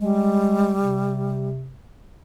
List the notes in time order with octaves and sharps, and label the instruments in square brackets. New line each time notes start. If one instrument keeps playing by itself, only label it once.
[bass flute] G3 [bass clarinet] G#3
[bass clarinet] C3